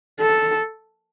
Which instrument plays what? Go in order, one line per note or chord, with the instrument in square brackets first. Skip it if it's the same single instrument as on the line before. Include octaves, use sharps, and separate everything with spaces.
[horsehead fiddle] A4